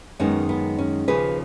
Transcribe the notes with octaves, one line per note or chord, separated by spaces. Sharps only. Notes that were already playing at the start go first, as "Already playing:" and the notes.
F#2 D#3 G#3 B3 C#4
B3
C#4
D#2 C#3 F3 A#3 G#4 B4